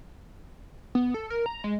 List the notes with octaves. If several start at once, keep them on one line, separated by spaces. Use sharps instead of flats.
B3
A4
A#4
A#5
G#3